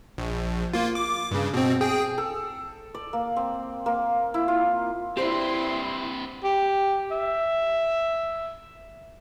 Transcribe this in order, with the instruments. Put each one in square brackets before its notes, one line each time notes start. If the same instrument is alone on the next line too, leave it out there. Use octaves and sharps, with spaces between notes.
[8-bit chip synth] A#1
A#3 F4
D6
G2 C#3
B2 C4
G#4 G5
[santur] A4
D5
A#3
C4
A#3
E4
F4
[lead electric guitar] C4 B4 [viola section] E4 C6 [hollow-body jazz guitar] G4 C5 D5
[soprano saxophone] G4
E5